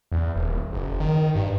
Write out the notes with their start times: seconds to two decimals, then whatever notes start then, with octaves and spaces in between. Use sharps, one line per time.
0.12 E2
0.36 D#1
0.73 F#1
1.00 D#3
1.35 G2